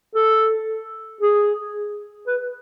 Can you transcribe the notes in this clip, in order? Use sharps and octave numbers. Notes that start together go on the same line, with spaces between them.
A4
G#4
B4